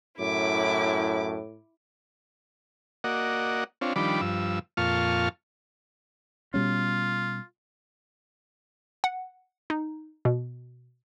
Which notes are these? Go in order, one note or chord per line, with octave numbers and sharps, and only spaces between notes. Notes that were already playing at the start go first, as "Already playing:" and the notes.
F#2 A2 E4 D6
A#3 F#4 D5 D#5 F#5
C4 D4 F4 C#5
D#3 F3 G3 D4 B5 D6
G2 F3 E6
F2 A#2 F4 A5 C#6 F6
B2 G3 C#4 F4
F#5
D#4
B2